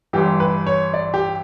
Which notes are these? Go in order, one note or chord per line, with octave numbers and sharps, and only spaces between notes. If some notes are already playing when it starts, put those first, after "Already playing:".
G1 G2 E3 G4
B4
C#5
D5
G4